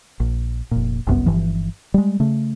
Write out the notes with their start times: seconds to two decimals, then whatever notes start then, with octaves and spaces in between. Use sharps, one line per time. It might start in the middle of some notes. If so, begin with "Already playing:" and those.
0.20 A#1
0.71 F1 A#2
1.07 G1 C2 F#2 B3
1.26 G1 G2 E3 F3
1.94 G3 G#3
2.20 C#3 A3